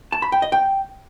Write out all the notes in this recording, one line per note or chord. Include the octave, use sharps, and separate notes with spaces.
A5
B5
G5
D#5
G5